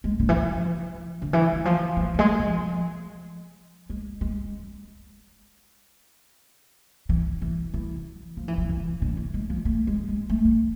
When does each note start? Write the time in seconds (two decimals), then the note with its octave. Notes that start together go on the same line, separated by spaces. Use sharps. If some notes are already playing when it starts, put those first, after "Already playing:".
0.04 G#3
0.19 D3
0.29 E3
0.37 F3
1.22 D3
1.33 E3
1.53 E3
1.65 F3
1.97 F3
2.14 F3
2.19 G#3
2.39 F3
3.90 G#3
4.21 G#3
7.09 E3
7.42 E3
7.74 E3
8.37 F3
8.48 E3
8.58 F3
8.69 E3
9.02 D3
9.17 E3
9.34 G#3
9.50 F3
9.65 A3
9.87 G#3
10.08 G#3
10.29 A3
10.45 A3